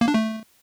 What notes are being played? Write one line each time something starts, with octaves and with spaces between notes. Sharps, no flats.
A#3
D4
A3